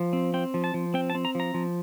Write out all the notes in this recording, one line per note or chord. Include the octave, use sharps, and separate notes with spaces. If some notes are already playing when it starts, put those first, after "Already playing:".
Already playing: F3
C4
C4 G5
F3
A5
F3
C4 G5
A5
C4
A#5
F3 A#5
F3